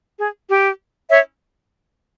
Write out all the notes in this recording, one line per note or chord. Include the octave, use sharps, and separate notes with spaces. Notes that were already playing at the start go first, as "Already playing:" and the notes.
G#4
G4
C#5 E5